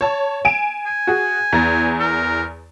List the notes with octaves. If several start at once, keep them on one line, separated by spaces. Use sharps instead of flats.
C#5 A5
G#5 D7 E7
G#5
F#4 G#4
E2 A#5 A6
A#4